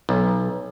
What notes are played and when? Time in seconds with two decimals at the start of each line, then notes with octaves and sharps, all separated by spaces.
0.09 B1